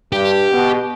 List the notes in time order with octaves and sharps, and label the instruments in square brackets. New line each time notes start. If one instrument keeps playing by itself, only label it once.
[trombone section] G2 [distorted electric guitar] G4
[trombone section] B2